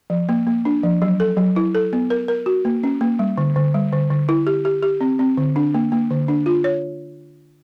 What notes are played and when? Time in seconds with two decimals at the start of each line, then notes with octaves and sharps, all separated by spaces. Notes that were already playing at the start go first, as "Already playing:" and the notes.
0.10 F3
0.29 A#3
0.47 A#3
0.65 D4
0.83 F3
1.02 F#3
1.20 A4
1.37 F#3
1.56 E4
1.75 A4
1.93 B3
2.10 A#4
2.28 A#4
2.46 F#4
2.65 A#3
2.83 C#4
3.01 A#3
3.19 G3
3.38 D3
3.56 D3
3.74 G3
3.92 D3
4.10 D3
4.29 E4
4.47 G4
4.65 G4
4.83 G4
5.01 C4
5.19 C4
5.37 D3
5.56 D4
5.74 A#3
5.92 A#3
6.11 D3
6.28 D4
6.46 F4
6.64 C#5